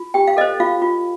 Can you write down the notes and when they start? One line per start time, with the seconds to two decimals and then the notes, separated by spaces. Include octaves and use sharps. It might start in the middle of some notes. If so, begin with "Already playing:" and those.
Already playing: F4
0.14 G4 G5
0.28 F5
0.37 A4 C5 D#5
0.60 F4 F5
0.82 F4